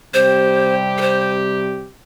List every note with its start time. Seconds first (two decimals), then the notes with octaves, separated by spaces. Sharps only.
0.14 C3 G3 C4 G4 C5
0.98 A4
1.01 C5